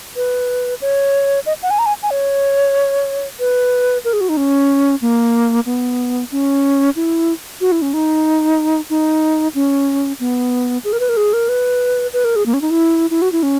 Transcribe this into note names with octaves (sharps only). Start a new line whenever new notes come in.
B4
C#5
D#5
F#5
G#5
A#5
G#5
G#5
C#5
B4
A#4
G#4
F#4
D#4
C#4
A#3
B3
C#4
E4
F#4
E4
C#4
D#4
D#4
C#4
B3
G#4
A#4
B4
A#4
G#4
A#4
B4
B4
A#4
G#4
A#3
C#4
D#4
E4
E4
F#4
E4
C#4